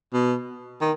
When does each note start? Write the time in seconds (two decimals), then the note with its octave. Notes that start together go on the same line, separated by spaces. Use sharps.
0.14 B2
0.81 D#3